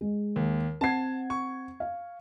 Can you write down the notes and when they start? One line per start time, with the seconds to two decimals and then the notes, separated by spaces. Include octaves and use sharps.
0.01 G#3
0.36 D#2
0.81 C4 F#5 A5 G#6 C7
1.30 C#6
1.80 F5